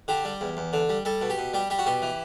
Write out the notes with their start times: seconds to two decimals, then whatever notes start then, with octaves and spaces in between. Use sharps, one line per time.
0.08 D3 G4
0.25 G3
0.41 E2
0.57 E2
0.73 D3
0.89 G3
1.05 G3 A4
1.21 B2
1.30 G4
1.38 B2
1.54 G3 G4
1.70 G3 G4
1.79 F#4
1.86 B2 G4
2.02 E3